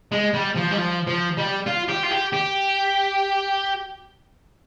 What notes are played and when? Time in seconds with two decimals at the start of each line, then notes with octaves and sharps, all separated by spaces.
0.12 G#3
0.34 G3
0.56 F3
0.71 G3
0.78 F3
1.07 F3
1.37 G3
1.66 F4
1.88 G4
2.03 F4
2.11 G4
2.33 G4